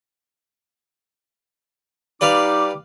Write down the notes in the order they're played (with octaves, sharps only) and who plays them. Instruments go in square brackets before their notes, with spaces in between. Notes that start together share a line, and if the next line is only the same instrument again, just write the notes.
[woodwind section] G3 D#4 D6 [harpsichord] B4 D5 F5